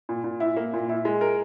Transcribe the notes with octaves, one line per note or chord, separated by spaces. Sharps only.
A#2
A#2
E4
A#3
A#2
E4
G#3
A#4